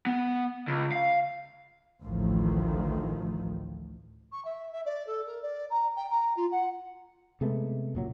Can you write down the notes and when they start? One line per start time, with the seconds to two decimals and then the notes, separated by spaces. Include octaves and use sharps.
0.06 B3
0.67 C#2
0.92 F5
2.03 A1 D2 A2 D#3 F3
4.32 C#6
4.45 E5
4.72 E5
4.85 D5
5.07 A4
5.26 A#4
5.42 D5
5.70 A#5
5.97 G5
6.10 A#5
6.37 F4
6.51 F#5
7.41 C3 G#3 A3 B3
7.95 F#1 A#2 F#3